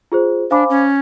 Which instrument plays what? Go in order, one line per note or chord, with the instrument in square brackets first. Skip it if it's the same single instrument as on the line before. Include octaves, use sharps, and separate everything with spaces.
[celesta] F4 G#4 C5
[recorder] D4 [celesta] C5 F5 G#5 B5 D6
[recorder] C#4